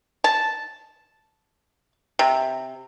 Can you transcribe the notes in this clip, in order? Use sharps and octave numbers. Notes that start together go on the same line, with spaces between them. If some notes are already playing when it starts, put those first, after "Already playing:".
A5
C3